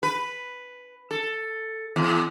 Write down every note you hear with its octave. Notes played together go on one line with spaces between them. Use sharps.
B4
A4
E2